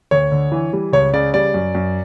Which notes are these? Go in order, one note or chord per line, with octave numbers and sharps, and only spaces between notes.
D2 C#5
D3
E3
G3
C#2 C#5
C#3 D5
G3 D5
F#2
F#2